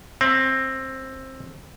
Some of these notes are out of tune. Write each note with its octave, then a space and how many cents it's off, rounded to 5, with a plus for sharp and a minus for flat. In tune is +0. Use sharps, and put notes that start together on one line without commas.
C4 +15 E5 +15